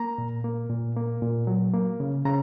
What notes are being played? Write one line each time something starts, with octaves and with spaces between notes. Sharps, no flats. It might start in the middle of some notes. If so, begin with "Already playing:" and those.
Already playing: A#3 A#5
A#2
A#3
A#2
A#3
A#2
F#3
A#3
C#3
C#3 A#5